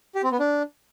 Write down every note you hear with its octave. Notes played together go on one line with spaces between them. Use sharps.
G4
C4
B3
D4